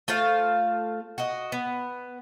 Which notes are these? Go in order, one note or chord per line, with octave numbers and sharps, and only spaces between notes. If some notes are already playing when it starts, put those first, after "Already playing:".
A3 F4 C5 F5
F#4 D#5
B3